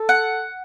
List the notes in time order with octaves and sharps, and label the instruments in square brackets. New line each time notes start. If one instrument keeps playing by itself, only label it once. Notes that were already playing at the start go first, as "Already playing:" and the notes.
Already playing: [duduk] A4
[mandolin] F#5